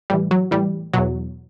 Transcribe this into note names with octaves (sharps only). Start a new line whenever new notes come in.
A2 E3 G3
F#3
A2 E3 G3
E2 B2 F#3